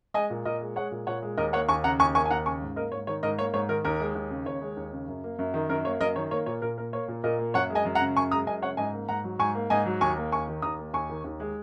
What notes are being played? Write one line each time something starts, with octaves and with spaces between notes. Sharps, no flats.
G#3 D#5 G#5
A#2
A#2 A#4 D#5
G#3
G#3 C#5 F#5
A#2
A#2 C#5 F#5
G#3
D#2 A#4 D#5
A#3 C#5 F#5
D#2 G#5 C#6
C#3 F#5 A#5
D#2 G#5 C#6
A#3 G#5 C#6
G#5
D#2 F#5 A#5
C#3 G#5 C#6
G#2
A#3 A#4 D#5
G#2 C#5
D#3 C#5
G#2 A#4 D#5
A#3 C#5
G#2 C#5
D#3 A#4
D#2 A#4
G#3
D#2
C#3
D#2 C#5
G#3
D#2
C#3
F#2
A#3
F#2
D#3
F#2 A#4
A#3 C#5
F#2 A#4 D#5
D#3 C#5
A#3 C#5
A#2 C#5
A#2 A#4
A#3 A#4
A#3 C#5
A#2
A#2 A#4 D#5
A#3
F#2 C#5 F#5
G#3
D#5 G#5
F#2
F#5 A#5
C#3
F#2 G#5 C#6
G#3 A#5 D#6
F#2 D#5 G#5
C#3 C#5 F#5
G#2 D#5 G#5
A#3
G#2 F#5 A#5
F#3
G#2 G#5 C#6
A#3
G#2 D#5 G#5
F#3
D#2 G#5 C#6
A#3
D#2 G#5 C#6
D#3
D#2 A#5 D#6
A#3
D#2 G#5 C#6
D#3
D#2
G#3